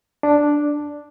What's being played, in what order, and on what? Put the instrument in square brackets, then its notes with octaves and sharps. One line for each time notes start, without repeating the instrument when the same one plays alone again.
[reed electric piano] D4